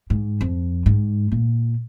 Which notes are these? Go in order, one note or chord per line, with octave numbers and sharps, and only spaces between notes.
G#2
F2
G#2
A#2